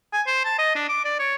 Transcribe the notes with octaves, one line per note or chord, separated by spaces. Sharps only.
G#5
C5
A5
D#5
D4
D6
D5
C#5